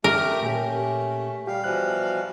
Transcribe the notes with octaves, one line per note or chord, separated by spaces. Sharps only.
A3 G4 A#4
A#2 A3 C#4 G4
G3 G4 F5
B2 E3 F3 F#6